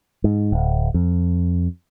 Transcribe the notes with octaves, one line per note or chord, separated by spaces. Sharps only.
G#2
D1
F2